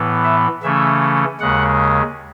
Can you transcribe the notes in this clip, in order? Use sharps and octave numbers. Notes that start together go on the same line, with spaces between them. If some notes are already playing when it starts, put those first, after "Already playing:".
Already playing: A2 E3 B3
E5
C#3 E3 A3 C#4 E5
D#2 C#3 G#3 F#5